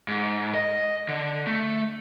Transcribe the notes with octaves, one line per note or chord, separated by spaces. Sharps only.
G#2
D#5
D3
A3